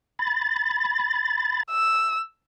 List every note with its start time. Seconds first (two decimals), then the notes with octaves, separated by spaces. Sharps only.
0.19 B5 A6
1.71 E6